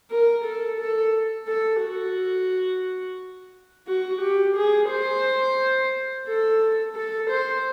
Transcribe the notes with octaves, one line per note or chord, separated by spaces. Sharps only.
A#4
A4
A4
A4
F#4
F#4
G4
G#4
C5
A4
A4
C5